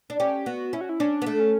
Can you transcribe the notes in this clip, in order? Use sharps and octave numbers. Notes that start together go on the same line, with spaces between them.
D4
C#4 G4
B3 F#4
C#4 E4
F#4
E4
C#4 D4
B3
A3
C#4